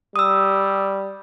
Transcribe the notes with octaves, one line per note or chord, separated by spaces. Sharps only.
G3 D#6 E6